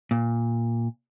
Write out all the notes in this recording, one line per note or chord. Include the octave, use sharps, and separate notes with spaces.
A#2